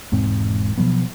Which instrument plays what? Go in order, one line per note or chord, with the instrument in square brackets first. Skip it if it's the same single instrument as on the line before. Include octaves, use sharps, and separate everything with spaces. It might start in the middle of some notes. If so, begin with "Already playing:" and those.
[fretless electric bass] E1 G#2 C4
B2 F3 F#3 B3